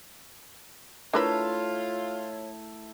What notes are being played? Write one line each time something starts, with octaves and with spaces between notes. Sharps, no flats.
A3 D4 E4 F4 A#4 B4 C#5